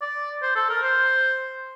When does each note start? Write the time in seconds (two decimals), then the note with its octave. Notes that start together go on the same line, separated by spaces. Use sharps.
0.02 D5
0.42 C5
0.56 A4
0.69 A#4
0.83 C5